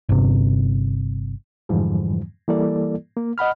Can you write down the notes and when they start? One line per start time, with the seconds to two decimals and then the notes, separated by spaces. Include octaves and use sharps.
0.09 G1 C3
1.69 F2 G#2 D3 E3 F3 G3
2.48 E3 G3 A#3 E4 A4 D5
3.16 A#3
3.38 D#5 F#5 B5 F6